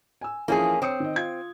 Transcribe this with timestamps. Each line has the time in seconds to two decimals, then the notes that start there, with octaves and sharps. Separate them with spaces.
0.21 G#5 E6
0.48 E3 F3 A#3 C#4 G#4
0.82 C4 C#5 D#6 C#7
1.00 D#3 D#5
1.16 F4 G#6